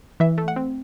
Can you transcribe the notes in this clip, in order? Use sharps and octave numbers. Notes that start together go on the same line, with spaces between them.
E3 E5
A3
F#5
C4